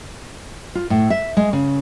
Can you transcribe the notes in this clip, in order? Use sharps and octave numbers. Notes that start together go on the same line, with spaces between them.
F4
A2
E5
G#3
C#3